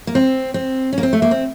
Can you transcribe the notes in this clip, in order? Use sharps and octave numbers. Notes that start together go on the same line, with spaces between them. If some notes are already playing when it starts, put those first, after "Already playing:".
A#3
C4
C4
C#4
A#3
C4
A3
A#3
C4